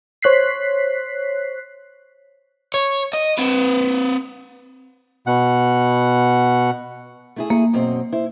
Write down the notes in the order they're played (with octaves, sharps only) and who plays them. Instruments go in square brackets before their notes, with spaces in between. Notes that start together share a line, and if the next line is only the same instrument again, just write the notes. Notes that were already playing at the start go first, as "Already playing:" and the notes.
[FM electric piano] C5 C#5 F#6 B6 C7
[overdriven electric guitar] C#5
D#5
C4 B4
[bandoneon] B2 F#5
[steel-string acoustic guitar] A3 E4 G#4
[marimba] A#3
[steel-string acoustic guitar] F#2 B2 C4
E4 C5